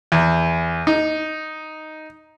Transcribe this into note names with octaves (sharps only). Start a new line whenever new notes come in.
E2
D#4